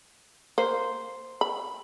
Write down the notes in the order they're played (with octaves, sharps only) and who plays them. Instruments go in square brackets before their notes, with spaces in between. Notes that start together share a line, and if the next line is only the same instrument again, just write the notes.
[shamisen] A#3 [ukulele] C5
[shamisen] B5